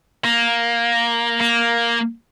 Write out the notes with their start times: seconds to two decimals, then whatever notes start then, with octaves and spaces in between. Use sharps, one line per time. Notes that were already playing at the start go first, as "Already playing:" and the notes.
0.24 A#3
1.41 A#3